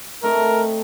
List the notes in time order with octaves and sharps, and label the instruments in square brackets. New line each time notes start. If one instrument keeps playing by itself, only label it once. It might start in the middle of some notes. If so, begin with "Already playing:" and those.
[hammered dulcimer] A3 C4 D#4 [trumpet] A#4